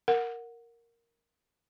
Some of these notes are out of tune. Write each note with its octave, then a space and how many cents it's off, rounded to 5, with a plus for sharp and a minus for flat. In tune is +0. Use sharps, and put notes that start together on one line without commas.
A#4 +0 F#5 -15